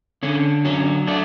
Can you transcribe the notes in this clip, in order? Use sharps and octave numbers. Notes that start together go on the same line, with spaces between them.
D3 C#4
F#3 C#4
A3 D4